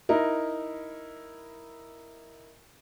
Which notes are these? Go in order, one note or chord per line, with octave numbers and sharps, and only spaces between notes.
D#4 E4 A#4